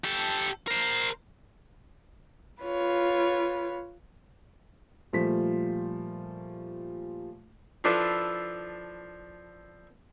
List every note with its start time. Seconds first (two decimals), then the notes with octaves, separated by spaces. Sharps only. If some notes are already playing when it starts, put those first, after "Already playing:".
0.04 G4 A4
0.68 A#4 C5
2.63 F4 B4 C#5
5.13 A#2 F3 G3 A3 B6
7.84 F3 D4 E4 F4 A4 B4